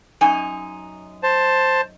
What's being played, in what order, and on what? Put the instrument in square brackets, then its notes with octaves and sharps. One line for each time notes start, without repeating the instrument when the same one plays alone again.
[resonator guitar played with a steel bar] F#2 D#4 G#5
[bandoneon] C5 A5